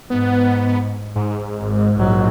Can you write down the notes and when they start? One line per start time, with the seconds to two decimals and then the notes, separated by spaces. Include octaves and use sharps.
0.10 G#2 B3
1.15 G#2
1.58 G#1
1.96 A#1 F#3